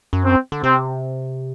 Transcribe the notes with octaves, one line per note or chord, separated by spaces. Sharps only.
F#2
C4
D3
C3 C4